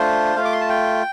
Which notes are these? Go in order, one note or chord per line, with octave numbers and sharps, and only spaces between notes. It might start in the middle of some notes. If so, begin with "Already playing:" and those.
Already playing: A3 D4 F4 C5
A3 F4 F5
D6
C6
A5
G5